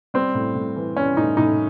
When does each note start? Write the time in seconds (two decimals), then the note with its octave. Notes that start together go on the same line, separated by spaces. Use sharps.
0.14 G3 C4
0.35 A2
0.55 A2
0.77 E3
0.96 G3 C#4
1.17 A2 D#4
1.37 A2 D#4